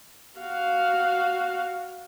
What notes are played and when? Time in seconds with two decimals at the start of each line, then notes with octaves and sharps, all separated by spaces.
0.39 F#4 F5